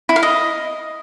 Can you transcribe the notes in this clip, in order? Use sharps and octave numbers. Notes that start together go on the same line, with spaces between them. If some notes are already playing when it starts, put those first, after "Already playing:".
E4
F5
D#5